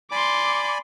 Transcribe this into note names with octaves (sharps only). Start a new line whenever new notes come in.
D5 G#5 B5 C6 D6